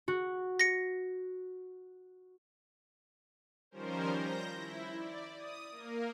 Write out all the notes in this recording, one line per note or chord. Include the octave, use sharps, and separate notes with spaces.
F#4
A#6 C#7
D#3 F3 G3 C#4 A#4 C5
G6 A#6
E4
D5
D#6
A#3 A#4